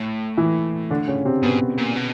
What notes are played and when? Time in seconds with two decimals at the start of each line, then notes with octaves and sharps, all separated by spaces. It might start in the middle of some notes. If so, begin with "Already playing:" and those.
Already playing: A2
0.37 E3 E4
0.90 D3 D4
1.07 C#3 C#4
1.25 C3 C4
1.43 G#2 B2 B3
1.78 A#2
1.96 B2